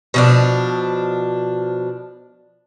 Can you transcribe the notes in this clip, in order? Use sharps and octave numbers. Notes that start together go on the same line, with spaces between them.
B2 F3 D4